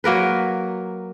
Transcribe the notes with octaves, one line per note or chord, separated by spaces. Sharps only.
F#3 A#3 A#4 B4